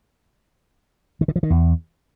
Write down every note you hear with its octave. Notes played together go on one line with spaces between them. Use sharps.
D#3
D3
F3
D#3
E2